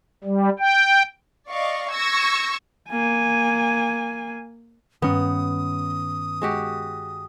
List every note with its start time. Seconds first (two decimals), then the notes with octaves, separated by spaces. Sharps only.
0.24 G3
0.59 G5
1.49 D5 D#5 F5 C#6
1.92 C#6 E6 G#6 A#6 C#7
2.89 A#3 G#5
5.02 G2 D#3 B3 C#4 A#5 D#6 G6
6.42 G#3 F#4 G4